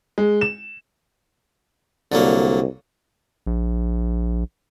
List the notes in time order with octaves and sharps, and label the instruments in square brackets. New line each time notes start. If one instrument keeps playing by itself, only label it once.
[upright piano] G#3
E7
[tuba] C2 [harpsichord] D3 F#3 A#3
[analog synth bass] A#1